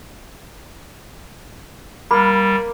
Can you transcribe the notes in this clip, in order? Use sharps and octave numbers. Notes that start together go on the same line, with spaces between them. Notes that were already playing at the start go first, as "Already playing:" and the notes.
G3 A#3 B5